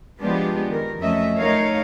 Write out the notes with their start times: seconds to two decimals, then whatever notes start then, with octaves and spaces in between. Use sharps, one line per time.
0.19 F3 G#3 B3 D4 F4 G4
0.69 D#3 A#4
0.99 F2 F#3 A3 C#4 D#5 E5
1.37 A3 D#4 A#4 C#5 F5